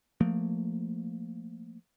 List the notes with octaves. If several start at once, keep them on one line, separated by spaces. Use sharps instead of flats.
F3 A3 A#3